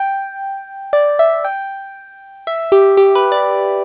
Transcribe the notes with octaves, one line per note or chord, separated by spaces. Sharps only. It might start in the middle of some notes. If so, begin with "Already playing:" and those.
Already playing: G5
D5
E5
G5
E5
G4
G4
B4
D5